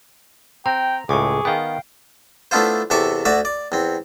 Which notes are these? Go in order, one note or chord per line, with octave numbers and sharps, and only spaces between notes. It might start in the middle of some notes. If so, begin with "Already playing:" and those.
C4 G5 A#5
C#2 A2 G#4 C#6 D6
D#3 B3 F5 G5
A3 B3 D4 E4 F4 C5
E2 C3 A4 E5 C#6 D6
D2 F#4 D5 E5
D5
E2 C4